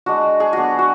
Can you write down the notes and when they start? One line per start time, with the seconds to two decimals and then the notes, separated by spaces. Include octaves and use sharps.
0.06 G#3 D4 F#4
0.40 G#4
0.53 F#3 B3 D4 F#4
0.79 F#4